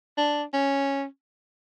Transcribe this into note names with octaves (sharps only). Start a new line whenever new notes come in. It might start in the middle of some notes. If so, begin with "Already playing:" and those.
D4
C#4